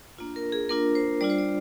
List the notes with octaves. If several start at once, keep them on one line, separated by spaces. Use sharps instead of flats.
A#3 D4 F4
A#4
G#4
A#3 D4 F4 A#4
C5
G3 D4 F4 D5
C5
D5